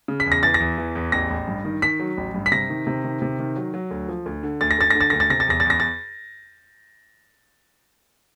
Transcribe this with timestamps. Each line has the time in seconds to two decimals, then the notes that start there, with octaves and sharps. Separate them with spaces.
0.08 C#3
0.20 B6
0.26 E2
0.32 A#6
0.43 E3 A6
0.54 A#6
0.60 E2
0.78 E3
0.95 E2
1.12 A1 A#6
1.30 A1
1.48 G2
1.65 D#3
1.82 D#3 B6
2.00 F#3
2.17 A1
2.34 G2
2.46 B6
2.52 C3 A#6
2.69 D#3
2.87 C3
3.04 D#3
3.22 C3
3.39 D#3
3.56 F#3
3.74 F#3
3.91 D2
4.08 F3
4.26 D2
4.43 D3
4.61 D2 A6
4.71 A#6
4.78 D2 A6
4.90 D3 A#6
5.01 A6
5.10 D2 A#6
5.20 A6
5.30 C3 A#6
5.40 A6
5.48 E2 A#6
5.60 A6
5.65 E2 A#6
5.80 A6